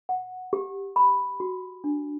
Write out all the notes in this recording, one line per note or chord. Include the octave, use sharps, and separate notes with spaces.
F#5
G4
B5
F#4
D4